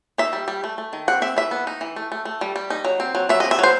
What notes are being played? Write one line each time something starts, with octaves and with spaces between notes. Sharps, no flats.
D#4 E5
G3
G3
A3
A3
D#3
C4 F#5
C4 E5
E3 E5
B3
D#4
E3
A3
A3
A3
G3
G3
D#4
F#3
C4
F#3
F#3 E5
D#5
C4
E5
F#3 C5